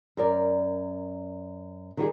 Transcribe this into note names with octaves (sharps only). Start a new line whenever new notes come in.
F#2 A#4 D5
D#3 G3 F#4 G#4